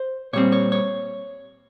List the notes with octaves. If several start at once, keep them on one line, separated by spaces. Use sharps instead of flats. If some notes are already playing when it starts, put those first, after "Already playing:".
Already playing: C5
A#2 G3 C4 C#5
C#5
C#5